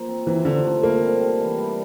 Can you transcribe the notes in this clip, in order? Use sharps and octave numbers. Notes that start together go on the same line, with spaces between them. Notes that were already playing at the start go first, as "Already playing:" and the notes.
Already playing: F3 A#3
C4
C3 E3
D3 F3
A3
G3 A#3
C4
G4
E3
G3